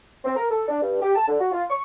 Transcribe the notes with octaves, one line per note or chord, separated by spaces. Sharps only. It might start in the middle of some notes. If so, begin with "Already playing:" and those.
C4
A#4
A4
D4
G2
G4
A5
D3
F#4
F4
C#6